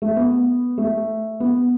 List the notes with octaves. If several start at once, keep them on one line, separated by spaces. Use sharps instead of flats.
A3
B3
A3
B3